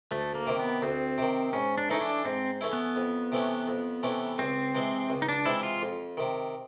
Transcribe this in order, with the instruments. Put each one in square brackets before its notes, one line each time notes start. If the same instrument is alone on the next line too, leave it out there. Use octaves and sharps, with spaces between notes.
[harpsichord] D2 [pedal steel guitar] A3
[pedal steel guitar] A#3
[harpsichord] C3 D#3
[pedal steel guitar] B3
[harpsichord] D2 [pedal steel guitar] C4
[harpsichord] C3 D#3
[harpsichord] G#2 [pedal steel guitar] C#4
[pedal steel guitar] D4
[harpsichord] E3 A3 C#4 E4 [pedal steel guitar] D#4
[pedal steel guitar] D4
[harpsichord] G#2 [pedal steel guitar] C4
[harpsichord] E3 A3 C#4 E4
[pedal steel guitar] B3
[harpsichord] F2
C3 E3 A3 C#4
F2
C3 E3 A3 C#4
[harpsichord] C#2 [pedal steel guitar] C4
[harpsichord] C3 E3 G#3
C#2
[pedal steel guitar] D#4
D4
[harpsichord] C3 E3 G#3 [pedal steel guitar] E4
[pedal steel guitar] F4
[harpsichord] F2
C3 D#3